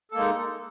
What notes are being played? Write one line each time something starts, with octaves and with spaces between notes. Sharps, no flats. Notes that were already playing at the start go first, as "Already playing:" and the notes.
G#3 A#3 D#4 A4